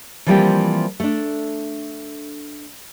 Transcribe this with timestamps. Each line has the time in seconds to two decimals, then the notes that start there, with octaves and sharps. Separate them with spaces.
0.26 E3 F3 G3 A#3 C4 G4
1.00 A3 D4